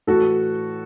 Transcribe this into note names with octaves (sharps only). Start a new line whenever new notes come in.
A2 E3 F#4 A4